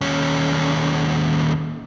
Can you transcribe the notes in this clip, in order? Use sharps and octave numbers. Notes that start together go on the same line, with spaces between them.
D#2 C#4